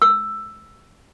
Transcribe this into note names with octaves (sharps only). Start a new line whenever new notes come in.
E6